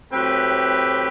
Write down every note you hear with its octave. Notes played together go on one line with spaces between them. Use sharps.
A2 F#3 C4 G4 B4